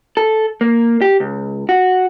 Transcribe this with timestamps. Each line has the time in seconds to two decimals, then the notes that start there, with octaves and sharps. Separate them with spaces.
0.17 A4
0.61 A#3
1.02 G4
1.20 C#2
1.69 F#4